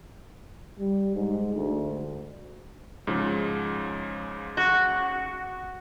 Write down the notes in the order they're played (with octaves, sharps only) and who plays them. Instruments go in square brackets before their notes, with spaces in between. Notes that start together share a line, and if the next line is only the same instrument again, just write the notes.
[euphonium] G3
G#2
D2
[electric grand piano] G#2 C#3 F3
[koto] F#4